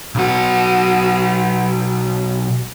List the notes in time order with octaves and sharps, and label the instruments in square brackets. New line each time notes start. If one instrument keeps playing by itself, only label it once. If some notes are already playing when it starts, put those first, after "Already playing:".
[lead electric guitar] B1 F#4